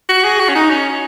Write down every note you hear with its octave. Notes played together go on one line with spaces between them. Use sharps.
F#4
G#4
F#4
C#4
D#4
C#4